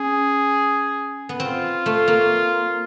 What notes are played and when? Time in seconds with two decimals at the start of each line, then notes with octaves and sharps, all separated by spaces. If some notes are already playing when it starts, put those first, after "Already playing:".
Already playing: C#4 G#4
1.29 B3
1.40 C4 F4
1.86 A3
2.08 A#3